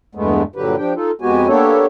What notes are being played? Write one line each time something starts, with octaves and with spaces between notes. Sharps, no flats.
E2 G2 G#3 A3 B3
G2 A#2 D3 F#3 G4 B4
F3 D4 G4 G5
D#4 F4 A4
F2 G#3 B3 F#4 G4 G#5
A#3 B3 D4 G4 A4 C#5